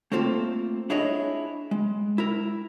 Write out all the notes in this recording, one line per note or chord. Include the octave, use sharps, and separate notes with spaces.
A3 A#3 C4 F4 A4
D4 E4 G#4 C#5 D#5
G#3
E4 A#4